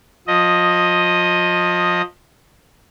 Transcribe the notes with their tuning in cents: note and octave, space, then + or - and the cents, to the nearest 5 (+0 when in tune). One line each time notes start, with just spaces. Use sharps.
F3 +25 D#5 +0